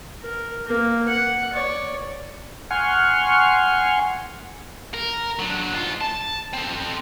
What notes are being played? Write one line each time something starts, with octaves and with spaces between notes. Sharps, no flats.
A#4
A#3
F#5
C#5 D5
F#5 G#5 C6 C#6 F6
A#4
F#3 D4
G#2 F4
A5
C4 A4